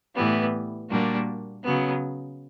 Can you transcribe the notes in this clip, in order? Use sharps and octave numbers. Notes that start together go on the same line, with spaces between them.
A2 E3 G3 B3
A#2 G3 A#3 D4 F#4
C#3 F#3 B3